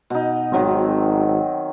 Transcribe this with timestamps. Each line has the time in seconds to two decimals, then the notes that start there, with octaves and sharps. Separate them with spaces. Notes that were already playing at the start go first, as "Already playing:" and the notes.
0.10 B2 D#4
0.52 G#1 D#3 F#3 C4